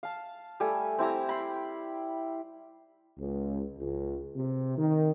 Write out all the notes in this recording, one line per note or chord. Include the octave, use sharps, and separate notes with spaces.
F5 A5
G3 A3 A4 G#5
C4 E4 G4 A#5
B5 C6
C#2
C#2
C3
D#3